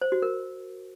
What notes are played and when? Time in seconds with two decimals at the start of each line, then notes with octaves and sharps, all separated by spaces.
0.01 C5
0.12 F#4
0.22 A#4